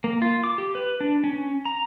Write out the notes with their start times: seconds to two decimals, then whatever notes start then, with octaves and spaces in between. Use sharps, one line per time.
0.04 A#3
0.22 F4
0.44 D6
0.58 G4
0.75 B4
1.01 D4
1.24 C#4
1.65 A#5